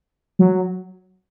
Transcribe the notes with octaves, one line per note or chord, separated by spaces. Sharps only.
F#3